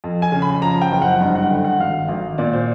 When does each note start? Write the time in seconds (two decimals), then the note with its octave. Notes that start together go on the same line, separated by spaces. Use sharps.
0.04 F2
0.22 G#5
0.32 C#3
0.42 B5
0.62 F3 A#5
0.82 G5
0.92 F#1
1.02 F#5
1.21 G2
1.35 F#5
1.50 D3 G5
1.65 F#5
1.80 G#1 F5
2.09 G#1
2.38 A#2 D5
2.53 C5